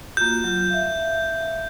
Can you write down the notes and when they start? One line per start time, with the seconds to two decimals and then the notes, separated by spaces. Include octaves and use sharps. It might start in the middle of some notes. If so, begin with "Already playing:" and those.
0.17 A#3 F4 F#4 G6
0.44 F#3 F4
0.70 E5 F5